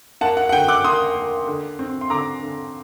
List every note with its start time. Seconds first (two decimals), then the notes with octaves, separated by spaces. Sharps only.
0.21 A#3 F#5 A5
0.37 F#5
0.49 F#5
0.53 D3 G5
0.68 D6 F#6
0.84 A#3 C6 D#6
1.16 A#3
1.47 D3
1.79 C4
2.01 C6
2.10 D3 A#5 D6
2.42 D3